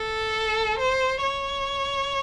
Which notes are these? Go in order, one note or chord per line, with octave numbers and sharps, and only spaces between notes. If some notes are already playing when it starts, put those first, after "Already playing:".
Already playing: A4
C5
C#5